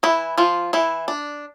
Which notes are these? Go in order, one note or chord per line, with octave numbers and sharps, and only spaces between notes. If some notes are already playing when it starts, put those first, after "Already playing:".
E3 E4
F3 F4
E3 E4
D4